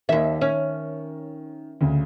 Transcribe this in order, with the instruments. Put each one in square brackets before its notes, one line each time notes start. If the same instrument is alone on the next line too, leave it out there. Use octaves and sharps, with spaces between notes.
[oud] D#2 E5 [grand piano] D#3
[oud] C#4
[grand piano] D2 C#3